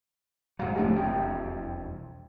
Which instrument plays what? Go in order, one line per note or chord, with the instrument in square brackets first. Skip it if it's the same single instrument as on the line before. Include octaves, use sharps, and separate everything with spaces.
[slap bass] G#2 F#3 [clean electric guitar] F5 F#5
[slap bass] D1 F2 D4 [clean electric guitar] A3 G4
[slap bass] E1 C2 F2 [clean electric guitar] G5